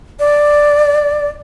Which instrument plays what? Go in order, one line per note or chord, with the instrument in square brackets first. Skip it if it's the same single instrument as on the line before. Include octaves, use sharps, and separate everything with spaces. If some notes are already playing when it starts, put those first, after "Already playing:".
[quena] D5